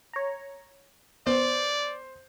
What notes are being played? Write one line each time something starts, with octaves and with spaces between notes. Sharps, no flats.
C#5 A#5
B3 C5 D5